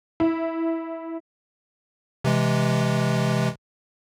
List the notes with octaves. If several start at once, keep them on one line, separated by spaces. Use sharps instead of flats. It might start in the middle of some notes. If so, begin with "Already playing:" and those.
E4
C3 E3 G#3